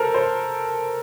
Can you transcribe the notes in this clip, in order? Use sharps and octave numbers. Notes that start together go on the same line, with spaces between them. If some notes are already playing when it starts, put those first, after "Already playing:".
Already playing: A4 A#4 C5
C5